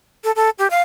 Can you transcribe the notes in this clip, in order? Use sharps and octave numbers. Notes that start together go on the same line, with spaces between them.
A4
A4
G4
F5